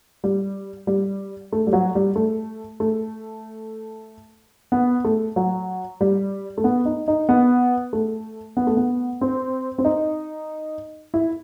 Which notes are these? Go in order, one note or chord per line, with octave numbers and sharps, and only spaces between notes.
G3
G3
A3
G3
F#3
G3
A3
A3
B3
A3
F#3
G3
A3
B3
D#4
D#4
B3
A3
B3
A3
B3
C4
C4
D#4
E4